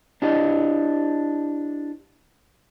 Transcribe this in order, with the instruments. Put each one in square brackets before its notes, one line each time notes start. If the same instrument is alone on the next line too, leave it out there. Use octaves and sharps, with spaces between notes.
[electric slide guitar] D4 E4 G4 C5 D#5